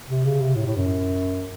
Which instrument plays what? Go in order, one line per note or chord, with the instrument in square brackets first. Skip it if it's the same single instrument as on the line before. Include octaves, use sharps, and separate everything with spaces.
[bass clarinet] C3
C#3
C3
A2
A2
F#2